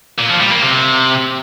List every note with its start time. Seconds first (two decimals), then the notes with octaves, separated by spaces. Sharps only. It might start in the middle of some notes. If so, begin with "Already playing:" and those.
0.19 A#2
0.30 F3
0.41 G3
0.52 A#3
0.63 C3